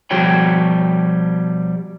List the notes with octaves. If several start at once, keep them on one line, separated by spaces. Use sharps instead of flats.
B2 F3 G3 F#4 C#5 G5